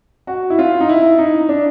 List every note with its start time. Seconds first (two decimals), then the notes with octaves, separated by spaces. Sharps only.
0.27 F#4
0.50 E4
0.59 F4
0.80 D#4
0.89 E4
1.18 D#4
1.49 D4